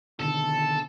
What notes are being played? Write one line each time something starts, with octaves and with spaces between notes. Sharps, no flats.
B2 D3 D#3 A4